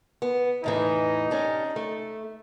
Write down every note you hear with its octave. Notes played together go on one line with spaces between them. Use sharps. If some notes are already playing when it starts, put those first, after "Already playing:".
B3
E2 A2 E3 D#4
C#4 D4 G4
A3